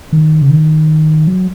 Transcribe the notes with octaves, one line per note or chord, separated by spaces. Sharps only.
D#3
C#3
D#3
F#3